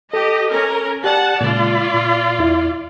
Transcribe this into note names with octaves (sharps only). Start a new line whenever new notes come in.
G4 A4 D#5
C#4 A#4
G4 D5 F#5 A5
A#2 C#3 G#3 F4 D5
A#2
E2 E4